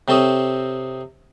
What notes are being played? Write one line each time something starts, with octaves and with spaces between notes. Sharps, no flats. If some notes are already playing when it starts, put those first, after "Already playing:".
C3 C4 A4 C#5 D#5